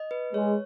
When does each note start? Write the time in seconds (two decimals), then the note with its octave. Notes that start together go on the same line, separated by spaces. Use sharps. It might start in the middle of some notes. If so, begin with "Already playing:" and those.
Already playing: D#5
0.11 B4
0.34 G#3 C#5